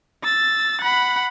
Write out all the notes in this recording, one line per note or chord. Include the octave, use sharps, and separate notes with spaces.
E6 A6
F#5 B5